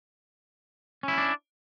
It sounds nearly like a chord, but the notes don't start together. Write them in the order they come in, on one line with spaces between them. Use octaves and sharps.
C#4 E4 B3 D4